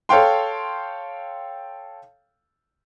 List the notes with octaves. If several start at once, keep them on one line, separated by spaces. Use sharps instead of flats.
A4 C#5 F5 G5 C6